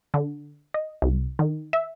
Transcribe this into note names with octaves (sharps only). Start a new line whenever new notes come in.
D3
D#5
C2
D#3
E5